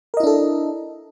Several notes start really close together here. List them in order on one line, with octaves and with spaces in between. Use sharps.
A#4 D#5 E4 D4 A4